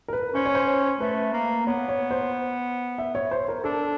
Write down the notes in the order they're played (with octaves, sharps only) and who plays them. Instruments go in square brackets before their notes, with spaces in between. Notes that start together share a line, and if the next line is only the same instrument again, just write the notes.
[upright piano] A#4
B4
[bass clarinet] C#4 [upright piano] C5
[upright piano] C#5
C5
[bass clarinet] A3 [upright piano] B4
[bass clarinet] A#3
[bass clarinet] B3 [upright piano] C#5
[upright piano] C#5
C5
E5
C#5
C5
A#4
[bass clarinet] D4 [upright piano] A4